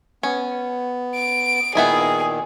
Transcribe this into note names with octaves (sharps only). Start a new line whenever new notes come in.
B3 C#4
D7
A#2 D#3 B3 E4 G#4 D#5